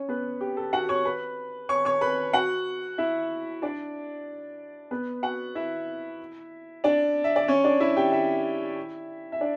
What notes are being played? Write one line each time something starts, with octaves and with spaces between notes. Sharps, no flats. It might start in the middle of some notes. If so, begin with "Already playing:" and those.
Already playing: C#4 C#5
B3 B4
G4
A4
F#4 F#5
C#5 C#6
B4 B5
C#5 C#6
C#5 C#6
B4 B5
F#4 F#5
E4 E5
D4 D5
B3 B4
F#4 F#5
E4 E5
D4 D5
E5
D5
C#4 C#5
D4 D5
E4 E5
G4 G5
E4 E5
E5
D4 D5